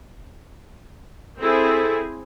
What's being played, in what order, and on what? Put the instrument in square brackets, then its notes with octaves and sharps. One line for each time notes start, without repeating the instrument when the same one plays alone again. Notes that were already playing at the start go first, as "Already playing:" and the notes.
[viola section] C4 E4 G#4 [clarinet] A4